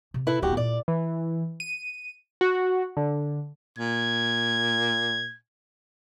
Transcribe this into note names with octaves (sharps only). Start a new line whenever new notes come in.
C3
E4 A4 B4
D1 F2 E4 F#4 G4
A#2 D5
E3
D#7
F#4
D3
A#2 G#6